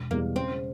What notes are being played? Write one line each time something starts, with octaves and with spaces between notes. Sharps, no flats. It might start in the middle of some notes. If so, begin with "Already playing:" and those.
Already playing: E1
E2 B2 G3 A#3
C#3 C4